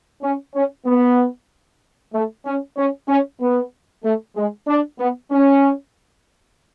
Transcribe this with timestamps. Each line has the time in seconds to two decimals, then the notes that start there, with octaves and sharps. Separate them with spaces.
0.23 C#4
0.55 C#4
0.86 B3
2.14 A3
2.46 C#4
2.77 C#4
3.09 C#4
3.41 B3
4.04 A3
4.36 G#3
4.68 D4
5.00 B3
5.32 C#4